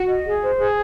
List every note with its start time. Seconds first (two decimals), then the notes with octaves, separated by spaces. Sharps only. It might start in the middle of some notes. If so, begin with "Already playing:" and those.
Already playing: F#4
0.08 D#5
0.25 G#4
0.41 C5
0.59 G#4